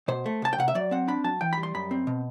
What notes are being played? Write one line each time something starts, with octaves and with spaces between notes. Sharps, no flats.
B2 C5
A3
C2 A5
G5
C3 F#5
E5
F#3 D5
C4 F#5
D4 B5
F#3 A5
E3 G5
G3 B5
C6
F#2 B5
C4
B2